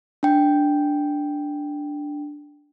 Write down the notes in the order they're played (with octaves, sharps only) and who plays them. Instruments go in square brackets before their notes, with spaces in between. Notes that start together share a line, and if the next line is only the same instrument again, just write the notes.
[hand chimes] D4 G5